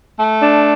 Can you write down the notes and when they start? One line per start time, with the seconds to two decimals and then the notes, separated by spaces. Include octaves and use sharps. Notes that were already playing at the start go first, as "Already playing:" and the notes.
0.18 A3
0.43 D4